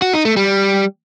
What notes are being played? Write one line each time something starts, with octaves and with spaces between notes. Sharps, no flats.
F#4
D#4
A3
G3